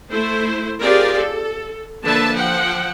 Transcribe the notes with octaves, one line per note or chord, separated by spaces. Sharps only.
A3 E4 C5
C4 F4 G4 G#4 A#4 D5
A4
D3 F3 A#3 B4 E5 A5
F3 F#5 G5